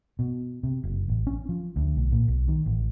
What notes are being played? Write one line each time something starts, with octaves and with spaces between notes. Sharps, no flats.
B2
C3
F#1
A1
C#4
F3
D2
B1
A#2
B1
D#3
A1